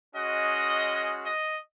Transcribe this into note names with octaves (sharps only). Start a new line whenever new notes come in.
G#3 C#4 F#4 D#5
D#5